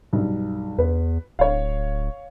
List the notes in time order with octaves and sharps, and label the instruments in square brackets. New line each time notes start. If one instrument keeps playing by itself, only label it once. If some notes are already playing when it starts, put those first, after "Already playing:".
[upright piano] B1 G2
[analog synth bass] E2 [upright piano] B4
[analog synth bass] D1 [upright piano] C#5 F5